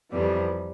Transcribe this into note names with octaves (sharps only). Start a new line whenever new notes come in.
F2 C3 E3 G3